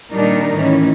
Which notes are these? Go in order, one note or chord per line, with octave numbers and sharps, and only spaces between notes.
A#2 D#3 G3 D4 D#4 A#4
A2 D#3 E3 C#4